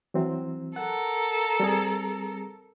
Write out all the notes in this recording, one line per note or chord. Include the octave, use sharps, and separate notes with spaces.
E3 F#3 C4
A4 A#4 F#5
G3 C4 G#4